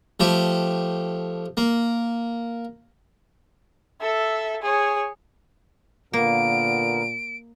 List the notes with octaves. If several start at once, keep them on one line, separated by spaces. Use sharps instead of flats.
F3 A3 G4
A#3
A4 E5
G#4 C#5
A#2 D3 A#3 B3 A#4 D7